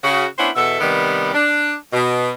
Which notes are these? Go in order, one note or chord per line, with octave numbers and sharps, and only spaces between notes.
C#3 F#4
B3 C#4 D4 E4 C5
E2 B2 A4 E5
C3 D#3 G3 B3
D4
B2